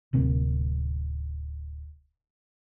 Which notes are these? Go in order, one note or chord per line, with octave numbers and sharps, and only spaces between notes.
D1 C3 A#3